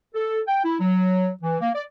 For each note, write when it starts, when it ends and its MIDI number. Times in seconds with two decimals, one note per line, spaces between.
0.14 0.40 69
0.47 0.63 79
0.64 0.76 64
0.80 1.30 54
1.42 1.56 52
1.61 1.70 58
1.74 1.83 74